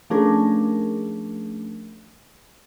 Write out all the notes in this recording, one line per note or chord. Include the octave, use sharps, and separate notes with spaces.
F3 A3 C#4 D4 G#4 A#4